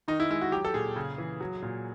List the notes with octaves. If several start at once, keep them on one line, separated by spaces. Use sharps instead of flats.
D#3 D#4
E4
G#3 E4
F#4
F#3 G4
A4
A#2 G#4
C#3
E3
F#3
A#2